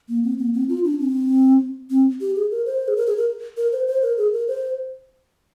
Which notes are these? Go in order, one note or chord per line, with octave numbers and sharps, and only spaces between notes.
A#3
C4
A#3
C4
F4
D4
C4
C4
G4
G#4
A#4
C5
G#4
A#4
G#4
A#4
A#4
C5
C5
A#4
G#4
A#4
C5